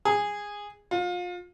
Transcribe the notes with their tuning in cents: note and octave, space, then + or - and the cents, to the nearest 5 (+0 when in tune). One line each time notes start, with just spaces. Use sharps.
G#4 -15
F4 +30